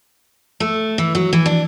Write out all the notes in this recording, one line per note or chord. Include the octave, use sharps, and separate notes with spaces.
A3
E3
F#3
E3
D4